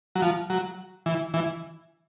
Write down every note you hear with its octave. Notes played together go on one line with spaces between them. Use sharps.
F#3
F3
F#3
E3
E3